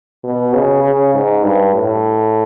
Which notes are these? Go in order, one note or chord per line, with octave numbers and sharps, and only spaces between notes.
B2
C#3
C#3
G#2
G2
A2